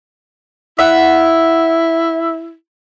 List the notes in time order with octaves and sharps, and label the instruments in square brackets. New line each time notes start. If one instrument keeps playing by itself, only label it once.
[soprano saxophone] E4 [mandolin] E5 F#5